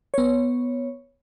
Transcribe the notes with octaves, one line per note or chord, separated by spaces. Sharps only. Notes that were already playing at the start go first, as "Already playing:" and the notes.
B3 C#5